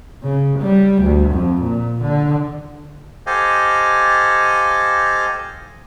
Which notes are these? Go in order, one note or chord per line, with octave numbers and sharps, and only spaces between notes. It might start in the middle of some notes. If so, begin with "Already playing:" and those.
C#3
G3
D2
F2
A#2
D3
G4 A4 C5 D#5 F5 G#5